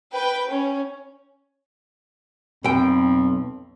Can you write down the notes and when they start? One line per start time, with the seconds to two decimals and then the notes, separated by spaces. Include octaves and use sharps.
0.12 B4 G5
0.48 C#4
2.64 B1 F2 G5